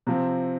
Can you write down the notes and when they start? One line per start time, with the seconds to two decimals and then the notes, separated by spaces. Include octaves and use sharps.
0.07 C3 F3 C4